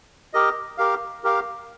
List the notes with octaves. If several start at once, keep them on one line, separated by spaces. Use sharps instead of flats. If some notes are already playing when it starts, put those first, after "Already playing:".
G4 A#4 D#5
G4 A#4 F5
G4 A#4 F5